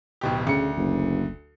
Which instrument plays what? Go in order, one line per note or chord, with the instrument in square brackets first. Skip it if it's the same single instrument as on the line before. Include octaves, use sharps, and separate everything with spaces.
[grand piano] D1 B2 G4
[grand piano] D2 C#7 [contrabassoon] C#3
[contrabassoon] F#1